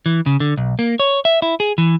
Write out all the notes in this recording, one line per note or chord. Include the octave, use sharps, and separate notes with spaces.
E3
C#3
D3
B1
A#3
C#5
E5
E4
G#4
E3